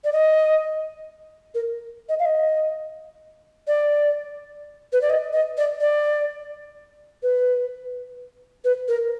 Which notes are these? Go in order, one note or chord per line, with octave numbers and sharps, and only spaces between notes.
D5
D#5
A#4
D#5
F5
D#5
D5
B4
D5
D#5
D#5
D5
D5
B4
B4
A#4